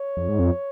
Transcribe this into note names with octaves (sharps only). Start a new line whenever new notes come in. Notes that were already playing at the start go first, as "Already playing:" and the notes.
Already playing: C#5
F2
G#2
F2